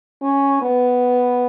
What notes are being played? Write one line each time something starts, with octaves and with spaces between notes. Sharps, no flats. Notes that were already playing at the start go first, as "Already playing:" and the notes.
C#4
B3